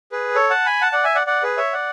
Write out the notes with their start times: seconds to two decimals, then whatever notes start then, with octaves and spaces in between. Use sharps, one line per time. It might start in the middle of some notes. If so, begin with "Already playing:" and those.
0.12 G#4 B4
0.35 A4 C#5
0.50 F#5 A5
0.66 G#5 B5
0.82 F#5 A5
0.92 D5 F#5
1.04 E5 G#5
1.15 D5 F#5
1.27 D5 F#5
1.43 G#4 B4
1.57 C#5 E5
1.73 D5 F#5